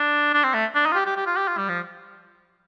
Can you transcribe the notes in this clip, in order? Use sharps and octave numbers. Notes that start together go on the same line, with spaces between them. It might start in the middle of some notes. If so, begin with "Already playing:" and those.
Already playing: D4
D4
C4
A3
D4
D#4
F4
G4
G4
G4
F4
G4
F4
G3
F3